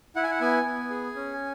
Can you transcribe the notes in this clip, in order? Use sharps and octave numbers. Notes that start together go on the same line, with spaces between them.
E4 F#5
G#5
F#5
B3 G#5
B3
G#4
C#4